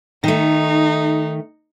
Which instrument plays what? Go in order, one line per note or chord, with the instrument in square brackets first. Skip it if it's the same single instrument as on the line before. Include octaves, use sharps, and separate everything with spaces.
[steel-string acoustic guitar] D#3 A3 [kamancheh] D#4